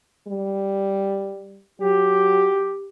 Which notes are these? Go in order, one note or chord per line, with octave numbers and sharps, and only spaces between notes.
G3
F#3 G4